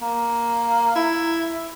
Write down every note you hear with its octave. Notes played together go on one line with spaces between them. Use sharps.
A#3
E4